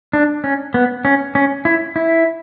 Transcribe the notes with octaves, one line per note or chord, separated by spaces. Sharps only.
D4
C#4
B3
C#4
C#4
E4
E4